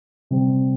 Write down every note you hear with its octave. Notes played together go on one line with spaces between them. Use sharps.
C3 G3 C4